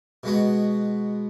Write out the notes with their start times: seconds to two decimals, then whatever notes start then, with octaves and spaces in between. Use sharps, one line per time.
0.23 B2 G#3 B3 F#4